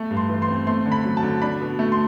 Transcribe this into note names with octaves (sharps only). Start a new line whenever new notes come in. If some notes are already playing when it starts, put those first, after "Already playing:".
Already playing: A3
G2
C6
E3
C6
C4
A3 C6
D3
B5
F#3
A5
D3
D4 B5
B2
A3
C6